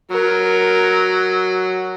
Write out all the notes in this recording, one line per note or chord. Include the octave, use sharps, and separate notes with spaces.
F#3 A#4